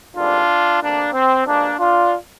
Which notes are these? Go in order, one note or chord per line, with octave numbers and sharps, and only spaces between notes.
G#1 G2 D3 G3 D4 F4
D2 C3 G3 A#3 D4
C4
G2 F3 G#3 A#3 D4
D4 F4